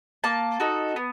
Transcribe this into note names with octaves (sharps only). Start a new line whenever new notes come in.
A#3 A5
D#4 F#4 A4
B3